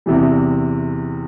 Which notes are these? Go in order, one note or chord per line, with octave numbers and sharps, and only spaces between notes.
E2 C3 E3 G3